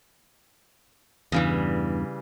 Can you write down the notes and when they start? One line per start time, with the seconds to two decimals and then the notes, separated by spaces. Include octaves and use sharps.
1.32 E2 G2 C#3 E3 G3